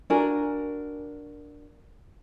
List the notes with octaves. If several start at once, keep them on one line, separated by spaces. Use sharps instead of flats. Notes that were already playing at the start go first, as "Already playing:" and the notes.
D4 F#4 A#4 G#5